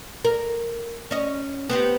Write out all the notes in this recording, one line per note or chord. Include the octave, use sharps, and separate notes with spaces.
A#4
C#4 D#5
B3 C4 G4